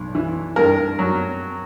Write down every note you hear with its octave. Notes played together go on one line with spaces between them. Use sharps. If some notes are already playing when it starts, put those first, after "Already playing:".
Already playing: B1
E3
G2 A#4
F#3